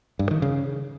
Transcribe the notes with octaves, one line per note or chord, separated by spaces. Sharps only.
G2
D#3
C#3